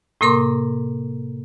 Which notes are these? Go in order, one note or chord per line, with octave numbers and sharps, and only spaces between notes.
A2 C3 A#3 A#4 C6 D6